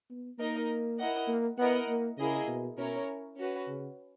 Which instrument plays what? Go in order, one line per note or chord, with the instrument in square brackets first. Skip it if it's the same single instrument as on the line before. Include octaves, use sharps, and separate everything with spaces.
[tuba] B3
[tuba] A#3 [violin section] D#4 A#4 D#5
[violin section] E4 A#4 D#5 F#5
[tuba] A#3
[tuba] B3 [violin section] E4 A#4 D#5 F#5
[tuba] A#3
[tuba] C#3 [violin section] A#3 E4 G#4 D#5
[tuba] B2
[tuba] B2 [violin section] C#4 E4 A#4 C#5
[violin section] C#4 F#4 B4
[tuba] C#3